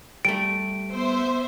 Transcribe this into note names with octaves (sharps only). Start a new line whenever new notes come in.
G3 A3 D7
B3 C5 E5